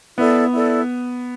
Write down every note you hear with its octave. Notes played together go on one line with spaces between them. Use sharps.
B3 E4 A4 D5
E4 A4 D5